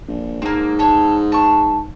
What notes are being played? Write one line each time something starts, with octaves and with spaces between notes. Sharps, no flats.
A#1
G#2 A#3 C4
A4 C#5
A5 C#6